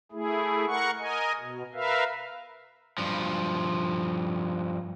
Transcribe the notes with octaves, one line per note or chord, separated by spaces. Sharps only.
A3 E4 G#4
A#4 F#5 C#6
A#4 D#5 G#5
B2
A#4 B4 E5 F5
G2 F3